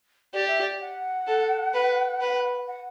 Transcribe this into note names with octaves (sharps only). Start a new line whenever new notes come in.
G4 D5
E5
D5
F#5
A4
B4
B4
F#5